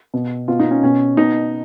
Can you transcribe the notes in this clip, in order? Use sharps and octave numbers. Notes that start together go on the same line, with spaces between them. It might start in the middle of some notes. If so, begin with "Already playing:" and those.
B2
B2 F4
D#4
C#4
B2 C#4
B2 D#4